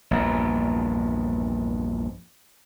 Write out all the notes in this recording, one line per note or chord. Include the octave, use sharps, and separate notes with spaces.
A#1 E2 G2